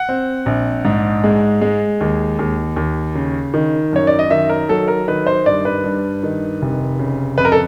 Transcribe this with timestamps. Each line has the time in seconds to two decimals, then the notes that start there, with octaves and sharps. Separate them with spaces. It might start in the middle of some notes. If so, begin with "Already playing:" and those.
Already playing: F#5
0.09 C4
0.46 A#1
0.85 G#2
1.24 G#3
1.61 G#3
2.01 D#2
2.39 D#2
2.76 D#2
3.15 C#3
3.54 D#3
3.93 F#2 C#5
4.07 D5
4.19 D#5
4.30 D#3 E5
4.49 A#4
4.69 F#3 A4
4.88 A#4
5.08 D#3 B4
5.27 C5
5.46 G2 D5
5.65 B4
5.84 G2
6.23 D#3
6.62 F1
6.99 C#3
7.38 F2 B4
7.45 A#4
7.52 A4